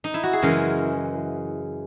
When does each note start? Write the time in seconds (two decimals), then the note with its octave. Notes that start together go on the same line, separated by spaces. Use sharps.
0.04 D#4
0.14 E4
0.23 F#4
0.33 G#4
0.42 F#2 C#3 E3 G#3 A#4